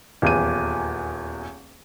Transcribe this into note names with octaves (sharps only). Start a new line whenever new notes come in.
D#1 E2 D#7